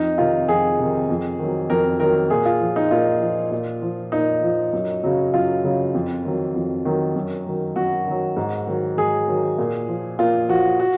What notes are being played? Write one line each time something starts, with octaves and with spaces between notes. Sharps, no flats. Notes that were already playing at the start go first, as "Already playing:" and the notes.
Already playing: F2 D#4
C3 D#3 F4
F2 G#4
C3 D#3
F2
D#3 F#3
F2 A#4
D#3 F#3 A#4
A#2 G#4
F4
F3
D#4
A#2 F4
F3
A#2
F3
A#2 D#4
F3
F#2
C#3 F#3
F#2 F4
C#3 F#3
F2
D#3 F#3
F2
D#3 F#3
F#2
D#3 F#3
F#2 F#4
D#3 F#3
G#2
D#3 F#3
G#2 G#4
D#3 F#3
A#2
F3
A#2 F4
F3 F#4
F#4